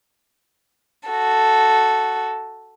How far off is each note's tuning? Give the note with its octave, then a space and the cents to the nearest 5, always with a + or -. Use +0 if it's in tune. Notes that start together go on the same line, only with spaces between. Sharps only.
F#4 +0 A4 +0